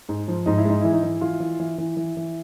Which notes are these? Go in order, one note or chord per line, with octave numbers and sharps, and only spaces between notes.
G#2
F3
G#2 D#4
E4
G#3 D#4
E3 E4
D#4
E3
E3 F4
E3
E3
E3
E3
E3